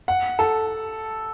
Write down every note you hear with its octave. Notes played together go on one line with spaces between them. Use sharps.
F#5
A4